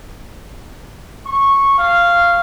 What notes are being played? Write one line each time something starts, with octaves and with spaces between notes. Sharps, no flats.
C#6
F5